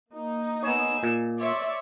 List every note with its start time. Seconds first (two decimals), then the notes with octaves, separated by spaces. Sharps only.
0.13 A#3 D#4
0.63 B3 G#4 C#5 E6
1.03 A#2
1.39 C#5 D5 E5 C6